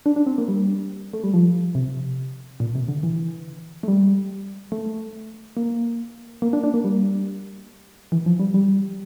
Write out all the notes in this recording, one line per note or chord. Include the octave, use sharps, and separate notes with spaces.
D4
D4
C4
A#3
G3
A3
G3
F3
C3
A#2
C3
D3
E3
A3
G3
A3
A#3
A#3
D4
D4
A#3
G3
E3
F3
G3
G3